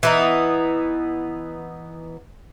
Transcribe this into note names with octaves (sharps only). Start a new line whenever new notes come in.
E3 B3 D#4